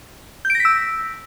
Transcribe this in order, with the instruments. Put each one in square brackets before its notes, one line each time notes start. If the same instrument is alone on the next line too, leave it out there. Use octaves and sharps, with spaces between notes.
[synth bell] G6
D7
A#6
B6
E6